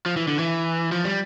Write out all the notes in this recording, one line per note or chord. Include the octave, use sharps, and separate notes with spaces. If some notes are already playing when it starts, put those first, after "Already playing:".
F3
E3
D3
E3
F3
G3